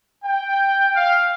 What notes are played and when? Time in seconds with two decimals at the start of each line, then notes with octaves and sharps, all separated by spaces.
0.23 G5
0.95 F5